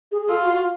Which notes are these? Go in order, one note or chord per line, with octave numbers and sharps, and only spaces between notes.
G#4
G#4
F4 A4
F#4
F#4